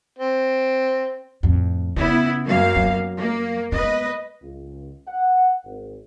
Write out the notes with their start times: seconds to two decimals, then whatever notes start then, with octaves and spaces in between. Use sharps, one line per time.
0.19 C4
1.43 F2 A2
1.96 C#3 B3 E4
2.45 F#2 A#3 F5
2.76 F#3
3.17 A#3
3.72 G#3 B3 B4 D#5
4.42 C#2
5.08 F#5
5.65 G#1